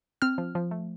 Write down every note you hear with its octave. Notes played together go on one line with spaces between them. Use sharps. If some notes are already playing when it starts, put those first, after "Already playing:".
C4 F6
F3
F3
A3